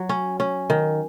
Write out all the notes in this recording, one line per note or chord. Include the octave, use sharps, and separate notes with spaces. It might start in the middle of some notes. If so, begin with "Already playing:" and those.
Already playing: F#3
C#4
C#4
D#3